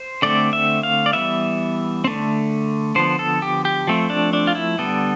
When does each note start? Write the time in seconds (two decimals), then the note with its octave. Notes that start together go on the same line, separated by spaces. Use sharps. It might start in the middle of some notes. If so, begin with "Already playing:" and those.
Already playing: C5
0.22 D3 A3 C4 D5
0.53 E5
0.83 F5
1.06 D5
1.13 E3 G3 B3 E5
2.04 C4
2.07 D3 A3
2.95 D3 F3 B3 C5
3.19 A4
3.42 G4
3.65 G4
3.87 F3 A3 C4
4.10 D4
4.33 D4
4.47 F4
4.55 E4
4.78 D3 G3 B3 A4